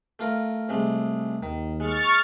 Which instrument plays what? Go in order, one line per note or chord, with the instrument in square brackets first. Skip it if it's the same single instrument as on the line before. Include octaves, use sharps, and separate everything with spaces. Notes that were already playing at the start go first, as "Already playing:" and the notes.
[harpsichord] A3 F4 A#4
C2 G#3 A3
[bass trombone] D#2 [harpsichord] D#3
[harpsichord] G#3 [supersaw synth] C#6 F6 A6